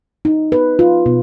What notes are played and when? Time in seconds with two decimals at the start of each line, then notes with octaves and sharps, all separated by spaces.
0.25 D#4
0.52 B4
0.79 F4
1.06 B2